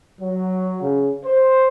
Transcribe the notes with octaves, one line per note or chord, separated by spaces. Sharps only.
F#3
C#3
C5